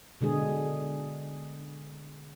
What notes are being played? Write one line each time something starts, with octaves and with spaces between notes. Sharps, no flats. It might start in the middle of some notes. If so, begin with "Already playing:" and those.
B2 D3 G#3 G#4